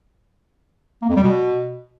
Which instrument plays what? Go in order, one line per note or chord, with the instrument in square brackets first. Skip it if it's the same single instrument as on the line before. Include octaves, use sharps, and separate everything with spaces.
[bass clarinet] A#3
F2
G3
B2